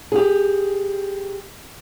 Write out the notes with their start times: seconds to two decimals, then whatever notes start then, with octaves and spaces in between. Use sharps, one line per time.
0.12 G4 G#4